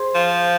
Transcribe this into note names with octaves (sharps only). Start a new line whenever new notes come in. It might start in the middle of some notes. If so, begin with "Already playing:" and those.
Already playing: G#4 C5
F3